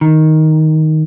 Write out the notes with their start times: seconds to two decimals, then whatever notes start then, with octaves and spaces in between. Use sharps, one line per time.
0.01 D#3